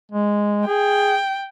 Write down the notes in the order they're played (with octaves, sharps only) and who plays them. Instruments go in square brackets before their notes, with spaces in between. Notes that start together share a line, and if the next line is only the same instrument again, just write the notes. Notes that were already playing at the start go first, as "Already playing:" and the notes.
[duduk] G#3
[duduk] G#4 [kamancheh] G5